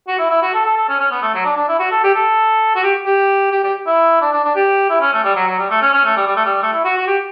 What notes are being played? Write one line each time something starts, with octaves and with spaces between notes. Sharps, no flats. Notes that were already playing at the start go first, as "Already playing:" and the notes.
F#4
E4
E4
F#4
A4
A4
A4
C#4
C#4
B3
A3
F#3
D4
D4
E4
F#4
A4
G4
A4
F#4
G4
G4
G4
G4
E4
D4
D4
D4
G4
E4
C#4
A3
G3
F#3
F#3
G3
A3
C#4
C#4
A3
G3
G3
A3
G3
A3
E4
F#4
F#4
G4